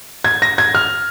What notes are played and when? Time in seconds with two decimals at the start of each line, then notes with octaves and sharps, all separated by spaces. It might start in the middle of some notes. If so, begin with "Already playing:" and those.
0.24 G#6
0.42 A#6
0.58 G#6
0.75 F6